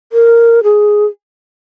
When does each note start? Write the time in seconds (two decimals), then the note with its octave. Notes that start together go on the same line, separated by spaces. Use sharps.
0.12 A#4
0.63 G#4